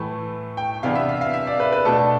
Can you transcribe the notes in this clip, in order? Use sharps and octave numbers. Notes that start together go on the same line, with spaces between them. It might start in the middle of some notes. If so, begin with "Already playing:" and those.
Already playing: A2 E3 A3
G5
C3 E3 B3 D4 F5
E5
F5
F5
E5
D5
B4
B4
B2 A3 D4 A4